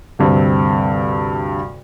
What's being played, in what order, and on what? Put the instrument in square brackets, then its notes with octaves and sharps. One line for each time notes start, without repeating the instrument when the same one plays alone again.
[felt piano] D2 G2 C3 C4